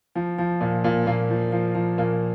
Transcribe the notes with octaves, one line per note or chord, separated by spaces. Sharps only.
F3
F3
A#2
A#2
A#2 A#3
F3
F3
F3
A#2 A#3